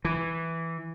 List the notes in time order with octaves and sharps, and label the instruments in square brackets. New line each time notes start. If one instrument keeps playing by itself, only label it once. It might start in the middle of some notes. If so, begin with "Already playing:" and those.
[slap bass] E3